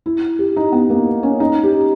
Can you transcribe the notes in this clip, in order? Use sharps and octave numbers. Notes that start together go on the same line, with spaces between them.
E4
G4
D#4
B3
A#3
C#4
D#4
G4